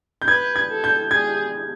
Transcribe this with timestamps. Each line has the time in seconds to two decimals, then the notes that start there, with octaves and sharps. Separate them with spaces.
0.22 G6
0.28 B4 G#6
0.56 G#6
0.70 A4
0.84 G6
1.11 G#4 G#6